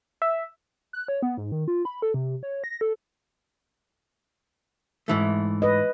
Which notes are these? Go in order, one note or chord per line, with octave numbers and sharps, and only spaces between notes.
E5
F#6
C#5
B3
G#2
D#3
F4
B5
A4
C3
C#5
A#6
A4
G#2 E3 A3
B4 D#5